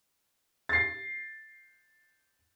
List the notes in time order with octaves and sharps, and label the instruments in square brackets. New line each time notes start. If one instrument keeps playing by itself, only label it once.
[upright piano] A6 C7